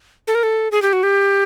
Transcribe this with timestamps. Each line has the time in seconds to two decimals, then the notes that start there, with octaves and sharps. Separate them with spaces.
0.27 A4
0.35 A#4
0.43 A4
0.72 G#4
0.82 G4
0.93 F#4
1.03 G4